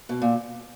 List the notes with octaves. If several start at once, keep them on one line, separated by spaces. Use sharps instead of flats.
B2
A#2